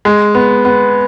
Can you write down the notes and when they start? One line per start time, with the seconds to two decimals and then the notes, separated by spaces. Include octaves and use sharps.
0.05 G#3
0.35 B3
0.65 B3